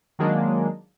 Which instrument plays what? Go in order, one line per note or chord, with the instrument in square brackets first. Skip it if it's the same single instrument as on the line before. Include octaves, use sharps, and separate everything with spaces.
[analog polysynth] D#3 F#3 G#3 A#3 D4